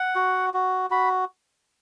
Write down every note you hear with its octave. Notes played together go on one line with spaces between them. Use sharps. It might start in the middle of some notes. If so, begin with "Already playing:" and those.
Already playing: F#5
F#4
F#4
F#4 B5